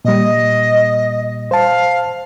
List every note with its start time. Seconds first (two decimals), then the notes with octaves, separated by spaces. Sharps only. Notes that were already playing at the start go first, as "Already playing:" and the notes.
0.05 A#2 G3 D#5
1.51 C5 F5 A5